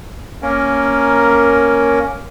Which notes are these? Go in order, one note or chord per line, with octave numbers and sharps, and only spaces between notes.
A#3 C#4 A#4